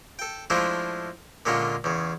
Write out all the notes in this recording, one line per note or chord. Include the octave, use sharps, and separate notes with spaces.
A4 G5
F3 G#3 A3 D4 E4 F4
A#2 D3 G#3 C#4 F4
E2 C#3